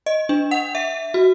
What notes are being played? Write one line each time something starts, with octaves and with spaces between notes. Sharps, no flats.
D#5
D4
F#5
E5
F#4